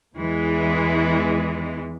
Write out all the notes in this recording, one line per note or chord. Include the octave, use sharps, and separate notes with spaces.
E2 E3 G#3